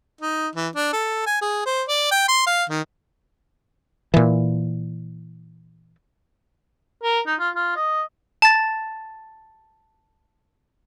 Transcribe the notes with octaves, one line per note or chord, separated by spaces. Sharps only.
D#4
E3
D4
A4
G#5
G#4
C5
D5
G5
C6
F5
D#3
A#2 E3
A#4
D#4
F4
F4
D#5
A5 A6